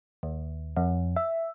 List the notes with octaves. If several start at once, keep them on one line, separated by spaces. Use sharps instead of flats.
D#2
F2
E5